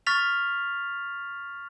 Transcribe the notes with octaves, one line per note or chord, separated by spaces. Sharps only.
C#6 F6 A6 B6 F7